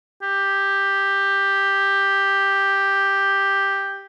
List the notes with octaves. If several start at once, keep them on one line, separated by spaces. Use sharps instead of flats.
G4